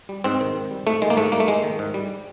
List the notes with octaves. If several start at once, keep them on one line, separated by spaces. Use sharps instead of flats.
G3
G#2 C4
D#3
G#2
G3
G#2 A3
D#3 G#3
A#3
G#2 A3
G3 A#3
A3
G#2 G#3
D#3
G#2
G3